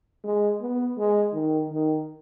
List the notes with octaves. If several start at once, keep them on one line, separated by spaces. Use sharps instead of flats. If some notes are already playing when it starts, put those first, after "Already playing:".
G#3
B3
G#3
D#3
D#3